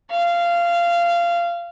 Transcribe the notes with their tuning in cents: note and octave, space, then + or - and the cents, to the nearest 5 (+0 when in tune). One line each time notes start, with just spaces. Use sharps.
F5 -20